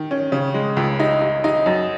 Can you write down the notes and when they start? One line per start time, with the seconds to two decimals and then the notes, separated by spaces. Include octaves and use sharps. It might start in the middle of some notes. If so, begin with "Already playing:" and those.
Already playing: D#3
0.11 C#4
0.32 C#3
0.54 G#3
0.77 C#2
1.00 D#4
1.22 D#4
1.44 D#4
1.66 F#2